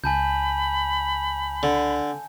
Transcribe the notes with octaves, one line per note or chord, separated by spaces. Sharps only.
C#2 G#5 A5 B5 G6
D3